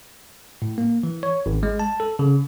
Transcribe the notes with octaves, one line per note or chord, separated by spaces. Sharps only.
A2
A#3
E3
C#5
G#1
G#3
A5
A4
C#3